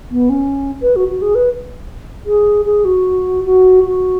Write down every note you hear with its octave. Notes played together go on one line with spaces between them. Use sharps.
B3
C#4
B4
F#4
F#4
G#4
B4
G#4
G#4
F#4
F#4
F#4